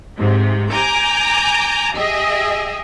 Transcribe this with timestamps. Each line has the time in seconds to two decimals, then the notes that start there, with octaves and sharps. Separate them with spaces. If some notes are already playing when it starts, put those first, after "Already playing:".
0.18 G#2 C3
0.70 G#5 A#5 D6 G6
1.95 G4 G#4 D#5 E5